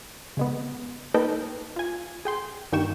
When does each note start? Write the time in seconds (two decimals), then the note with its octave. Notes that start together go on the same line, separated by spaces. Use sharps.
0.37 C#3 G#3 B3
1.14 A#3 D#4 A4 B4 G5 A5
1.76 F4 G#5
2.25 G#4 G5 C6
2.72 G2 D#3 A#3 G5 C#6 E7